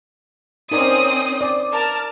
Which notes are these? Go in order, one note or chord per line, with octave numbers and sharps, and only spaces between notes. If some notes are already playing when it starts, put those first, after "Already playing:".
C4 C#4 D#4 A#4 D5 D#6
D5
A#4 A5 F6